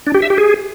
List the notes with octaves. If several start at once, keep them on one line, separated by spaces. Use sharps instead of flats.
D4
G4
E5
G4
G#4